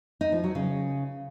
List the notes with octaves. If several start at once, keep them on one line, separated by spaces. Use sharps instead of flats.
D#4
F3
F#3
C#3